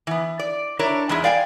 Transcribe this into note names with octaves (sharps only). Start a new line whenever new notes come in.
E3 B3
D5
D4 E4 A#4 C#5 D5
E2 G#3 E4 G#4
D5 F5 G5 G#5